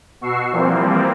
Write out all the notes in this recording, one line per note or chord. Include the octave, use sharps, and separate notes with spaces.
B2 F#4 C#6 E6 C7
E3 F3 G3 A#3 C4